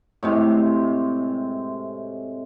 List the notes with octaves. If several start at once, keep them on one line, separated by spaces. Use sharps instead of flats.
A2 C3 G#3